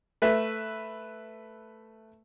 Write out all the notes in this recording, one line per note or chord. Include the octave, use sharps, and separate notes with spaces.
A3 B4 E5